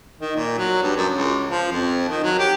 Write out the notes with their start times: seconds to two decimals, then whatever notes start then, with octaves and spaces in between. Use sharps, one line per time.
0.20 D#3
0.36 A#2
0.58 F#3
0.83 G2
0.96 F#2
1.13 C#2
1.48 F3
1.72 F2
2.08 D#3
2.23 F#3
2.39 G4